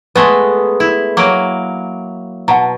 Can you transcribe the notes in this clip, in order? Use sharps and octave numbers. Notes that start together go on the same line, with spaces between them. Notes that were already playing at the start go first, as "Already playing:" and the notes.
G#3 A3 B3 B4 F#6
E4
F#3 A#3 D6 D7
B2 F#5 A5 A#5